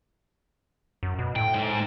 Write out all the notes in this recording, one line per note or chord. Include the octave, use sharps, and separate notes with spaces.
F#2
B2
A2 G5
G#2